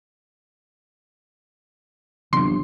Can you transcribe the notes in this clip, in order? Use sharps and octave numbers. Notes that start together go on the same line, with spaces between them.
G1 C3 E3 F#3 C6